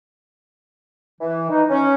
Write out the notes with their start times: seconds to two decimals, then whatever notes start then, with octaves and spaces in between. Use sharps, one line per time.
1.21 E3
1.50 D#4
1.70 C#4